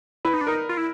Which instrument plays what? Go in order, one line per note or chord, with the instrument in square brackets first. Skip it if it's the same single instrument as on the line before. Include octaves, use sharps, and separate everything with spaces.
[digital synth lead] E4 [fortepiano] B4
[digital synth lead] D#4
D4
[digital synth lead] D#4 [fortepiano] A#4
[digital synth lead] F4
E4